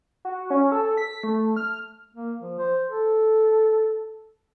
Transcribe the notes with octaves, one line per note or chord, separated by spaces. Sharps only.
F#4
C#4
A4
B6
A3
F6
A#3
F3
C5
A4